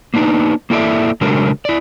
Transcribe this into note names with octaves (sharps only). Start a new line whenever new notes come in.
A#3 B3 D4 D#4
A#3 E4 A4 D5 E5
C#3 F#3 G#3 A3 D4 A#4
E4 D5